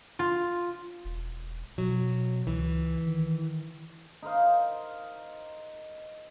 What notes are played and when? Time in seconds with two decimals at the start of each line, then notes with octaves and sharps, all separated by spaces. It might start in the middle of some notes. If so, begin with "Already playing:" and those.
0.19 F4
1.04 E1
1.78 B2 F#3
2.47 C#2 E3
3.06 D#3
4.22 D#4 A#4 C5 F5